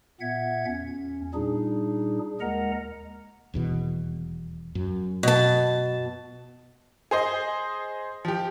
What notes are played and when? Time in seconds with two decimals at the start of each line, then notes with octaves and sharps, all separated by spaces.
0.21 A#2 B3 E5 F#5 G#6
0.66 E2 C#4
1.34 A#2 G3 D4 D#4 G#4
2.41 D#2 G#3 A#4 D#5 F#5 A#5
3.54 D#1 E2 B2
4.75 F#2
5.23 B2 A5
7.11 G#4 C5 D#5
8.25 F3 G4